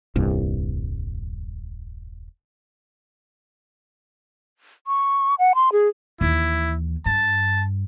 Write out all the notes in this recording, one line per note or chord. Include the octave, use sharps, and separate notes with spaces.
D#1 C2 G2
C#6
F#5
C6
G#4
D#2 E3 E4
G2 A5